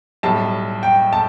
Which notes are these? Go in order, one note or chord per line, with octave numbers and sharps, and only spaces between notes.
B1 A2 G3 A5
G5
A5